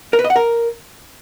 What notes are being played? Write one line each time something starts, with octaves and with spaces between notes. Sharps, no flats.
A#4
B4
D#5
F#5
A#4